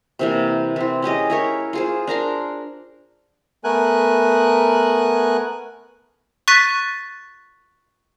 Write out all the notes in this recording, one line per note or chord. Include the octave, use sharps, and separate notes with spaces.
C3 E3 A#3
E3 C4
C#4 G4 G#4 D#5
E4 A#4 C#5
F4 G#4 C5
D4 A#4 A#5 C6
A3 B3 A#4 G#5 F#6
C#6 F#6 A6 B6 D#7